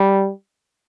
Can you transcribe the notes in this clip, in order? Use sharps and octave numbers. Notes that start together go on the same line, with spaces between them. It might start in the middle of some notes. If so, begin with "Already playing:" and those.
Already playing: G3